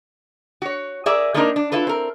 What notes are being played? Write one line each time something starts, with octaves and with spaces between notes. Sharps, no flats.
F#4 C#5
G#4 A#4 D5 E5
A3 A#3 C4 D4 D#4 A#4
D4
E4 F4 A4 B4
C4 A#4